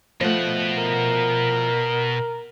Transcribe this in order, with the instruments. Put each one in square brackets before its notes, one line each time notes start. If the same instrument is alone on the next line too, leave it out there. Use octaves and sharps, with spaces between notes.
[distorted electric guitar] B2 F#5 [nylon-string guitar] F3 A3
[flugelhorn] A#4